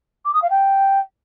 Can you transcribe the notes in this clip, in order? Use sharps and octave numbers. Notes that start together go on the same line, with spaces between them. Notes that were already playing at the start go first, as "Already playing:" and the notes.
D6
D#6
F5
G5